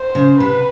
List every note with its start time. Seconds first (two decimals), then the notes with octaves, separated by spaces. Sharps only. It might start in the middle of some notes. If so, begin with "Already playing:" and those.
Already playing: C5
0.15 C#3
0.39 C3 B4